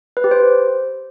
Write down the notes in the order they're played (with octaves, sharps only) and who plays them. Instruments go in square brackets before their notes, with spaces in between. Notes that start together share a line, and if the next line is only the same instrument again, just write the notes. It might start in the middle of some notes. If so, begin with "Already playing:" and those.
[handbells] B4
G4
C5